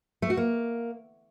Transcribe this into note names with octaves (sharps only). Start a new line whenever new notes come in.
A3
F#4
A#3